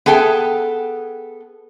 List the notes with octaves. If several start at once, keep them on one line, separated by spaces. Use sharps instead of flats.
B3 G#4 A4 G5